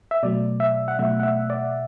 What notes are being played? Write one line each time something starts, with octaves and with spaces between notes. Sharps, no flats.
E5
B2 F#3 A3 D5
E5
F#5
B2 F#3 A3 E5
F#5
E5
D5